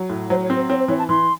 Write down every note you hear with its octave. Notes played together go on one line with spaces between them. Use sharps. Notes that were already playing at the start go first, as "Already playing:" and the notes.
Already playing: F#3
A2
F#3 C5
C#5
C4
C5
C4 C#5
C5
E3 C#5
A5
E3 C6